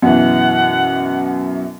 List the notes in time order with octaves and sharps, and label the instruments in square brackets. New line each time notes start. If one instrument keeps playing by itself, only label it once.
[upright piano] F#2 B2 E3 [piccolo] F#5